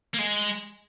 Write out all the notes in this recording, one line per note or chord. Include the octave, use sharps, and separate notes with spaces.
A#3
G#3